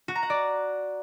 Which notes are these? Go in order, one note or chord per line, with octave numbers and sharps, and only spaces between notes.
F#4
A#5
F#5
D5